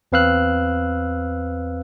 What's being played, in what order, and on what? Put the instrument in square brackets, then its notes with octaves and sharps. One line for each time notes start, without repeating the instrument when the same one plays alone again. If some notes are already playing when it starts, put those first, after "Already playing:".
[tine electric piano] E2 C4 B4 F5 E6 F#6